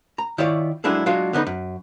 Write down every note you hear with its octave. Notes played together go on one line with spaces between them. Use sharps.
A#5
D#3 E4 F4 C#5 D5
F#3 G#3 D4 E4 G#4 A4
F#3 G#3 D4 F4 F#4
D3 B3 C#4 D#4 B4
F#2